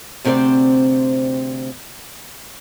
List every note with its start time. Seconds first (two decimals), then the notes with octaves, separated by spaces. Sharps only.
0.25 D2 C3 C4 G4 C5 D5